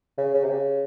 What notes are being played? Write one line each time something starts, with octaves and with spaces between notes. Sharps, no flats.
C#3
C#3
C3
C#3